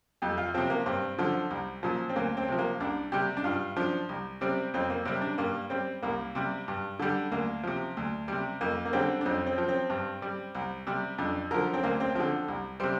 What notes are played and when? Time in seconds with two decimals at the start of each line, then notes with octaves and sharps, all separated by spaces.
0.22 F2 G4
0.38 F4
0.54 C3 F3 C4
0.70 A#3
0.86 G2 C4
1.18 D3 F3
1.51 C2
1.83 A#2 F3
2.09 C4
2.16 D2 A#3
2.37 C4
2.48 C3 F3
2.59 A#3
2.80 C2 D4
3.12 C3 G3 G4
3.37 D4
3.44 G2 F4
3.77 F3 D4
4.09 C2
4.41 C3 G3 C4
4.74 F2 C4
4.90 A#3
5.05 C3 G3 C4
5.21 D4
5.38 G2 A#3
5.70 G3 C4
6.02 C2 A#3
6.35 C3 G3
6.68 G2
6.99 D3 G3
7.32 D2 A#3
7.63 C3 F3
7.97 D2
8.28 C3 G3
8.61 F2 A#3
8.85 A#3
8.93 D3 G3 C4
9.21 D4
9.25 F2 C4
9.46 C4
9.58 F3
9.68 C4
9.90 G2
10.22 G3
10.55 C2
10.87 C3 G3
11.18 F2 D4
11.51 D3 F3 A#4
11.73 C4
11.83 D2 A#3
12.00 C4
12.15 D3 F3 C4
12.48 C2
12.80 C3 G3 C5